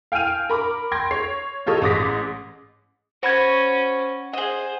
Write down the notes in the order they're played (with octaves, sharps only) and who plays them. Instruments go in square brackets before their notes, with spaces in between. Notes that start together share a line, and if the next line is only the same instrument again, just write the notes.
[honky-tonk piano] F5 G5 G#5 F6 D#7 F7
A#4 B5 D6
G5 C6 G#6 A#6
C#5 C7
F4 G4 A4 C#5 D#5
A1 G#2 D6 D#6 A#6 B6
[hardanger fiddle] C#4 [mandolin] F#4 C#5 [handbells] C5 B5 G#6
[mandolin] G#4 D#5 [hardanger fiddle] C5 [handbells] F#5